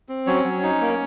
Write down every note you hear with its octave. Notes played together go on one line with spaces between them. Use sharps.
C4
F#3 C#4 C#5
F#3
D#4
A#3